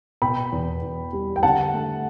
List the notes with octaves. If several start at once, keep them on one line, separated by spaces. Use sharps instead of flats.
B2 G5 B5
E2
E2
G3
G5
D3 F#5 A5
A3